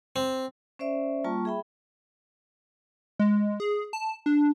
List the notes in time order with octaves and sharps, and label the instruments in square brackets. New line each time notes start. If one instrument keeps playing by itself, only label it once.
[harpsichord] C4
[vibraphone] C#4 C5 D5 E5
G3 A#3 F4 A5 C#6
G#4 E5 G5 B5
[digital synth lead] G#3
G#4
A5
D4